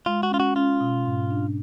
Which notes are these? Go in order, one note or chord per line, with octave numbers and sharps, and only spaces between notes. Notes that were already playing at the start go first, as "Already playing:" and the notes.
G#3 F4
F#4
C#4 F4
F#4
C#4 F4
B2
G#2
D4